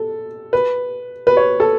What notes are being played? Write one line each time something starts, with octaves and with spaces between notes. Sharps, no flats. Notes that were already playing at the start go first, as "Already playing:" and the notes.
Already playing: A4
B4
B4
C#5
A4